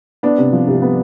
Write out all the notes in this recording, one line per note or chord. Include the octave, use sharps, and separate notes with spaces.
B3 D4
C3
F3
C2
B3